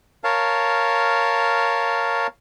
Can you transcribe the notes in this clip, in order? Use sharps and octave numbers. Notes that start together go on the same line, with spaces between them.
A#4 C#5 F5 A5